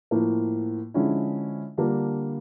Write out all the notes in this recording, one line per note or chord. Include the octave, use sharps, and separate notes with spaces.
A2 F3 A#3
D3 F3 G#3 C#4 E4
D3 G3 A#3 D4 F4